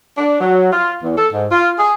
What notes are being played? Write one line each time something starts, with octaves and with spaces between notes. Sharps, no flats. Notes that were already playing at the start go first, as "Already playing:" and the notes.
D4
F#3
F4
E2
A4
G#2
F4
G#4